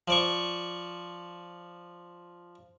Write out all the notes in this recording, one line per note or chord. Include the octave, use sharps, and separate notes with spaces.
F3 D5 C#6